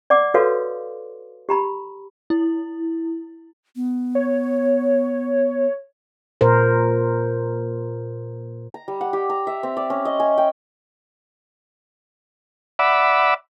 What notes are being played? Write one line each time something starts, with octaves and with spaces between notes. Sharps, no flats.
D5 F#5 D6
F#4 A4 B4 C#5 F5 C6
G4 A#5 B5
E4
B3
C#5
A#2 A#4 C5
A#5
G3
F#5
G4
A#5
E5
C4
D5
C#4
D#5
G#5
G5
D5 E5 F#5 B5 D6 E6